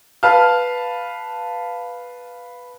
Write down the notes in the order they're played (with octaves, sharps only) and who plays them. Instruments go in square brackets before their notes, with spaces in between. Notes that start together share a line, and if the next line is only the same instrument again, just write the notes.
[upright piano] B4 F5 A5 F6